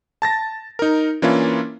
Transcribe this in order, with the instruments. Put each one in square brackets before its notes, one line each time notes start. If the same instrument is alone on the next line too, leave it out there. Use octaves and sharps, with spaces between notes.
[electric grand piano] A5 A6 A#6
D#4 A#4
E3 A#3 C#4 D4 E4 F4